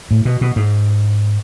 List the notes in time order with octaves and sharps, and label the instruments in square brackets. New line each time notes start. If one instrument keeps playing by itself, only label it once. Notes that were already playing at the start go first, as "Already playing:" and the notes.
[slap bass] A2
B2
B2
G#2